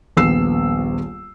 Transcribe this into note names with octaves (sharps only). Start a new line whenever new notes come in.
D#1 A#1 B3 E6 C7 E7